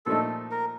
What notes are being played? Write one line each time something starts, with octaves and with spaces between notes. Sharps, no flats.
A#2 F3 A3 D#4 A4
A#4